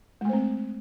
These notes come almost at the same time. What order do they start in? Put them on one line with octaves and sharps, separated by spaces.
G#3 A3 C5 C4